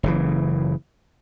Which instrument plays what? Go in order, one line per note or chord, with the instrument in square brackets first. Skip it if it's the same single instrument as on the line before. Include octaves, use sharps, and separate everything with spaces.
[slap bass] F#1 C#3 E3